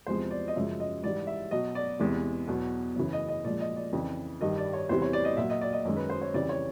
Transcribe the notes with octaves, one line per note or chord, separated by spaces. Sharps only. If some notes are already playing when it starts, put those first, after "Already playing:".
E2 C3 F3 G#3 C5
D5
D#5
F#2 C#3 F3 G#3 E5
D#5
G#2 E3 G3 D5
E5
B2 F#3 D#5
D5
E2 C3 E3 G#3
E2 B2 F#3
F#2 C#3 E3
D#5
D#5
A#2 F3 G#3 D5
D#5
D5
F2 C#3 E3
G2 D#3 G3 D#5
D5
C#5
E2 C3 E3 G3 C5
C#5
D5
D#5
A#2 F#3 E5
D#5
D5
D#5
F#2 D#3 G#3
B4
C5
C#5
F2 C#3 E3 G3 D5
C#5